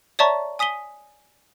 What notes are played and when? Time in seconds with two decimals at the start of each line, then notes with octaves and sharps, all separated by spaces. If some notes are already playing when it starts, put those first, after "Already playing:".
0.19 C#5 D5 E5 A5 A#5 C#6
0.59 G#5 D#6 B6 D#7 G7